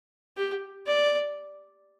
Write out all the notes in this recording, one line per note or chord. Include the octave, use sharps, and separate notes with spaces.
G4
D5